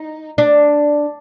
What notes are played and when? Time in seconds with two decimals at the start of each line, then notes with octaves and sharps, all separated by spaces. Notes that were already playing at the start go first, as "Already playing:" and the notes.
Already playing: D#4
0.38 D4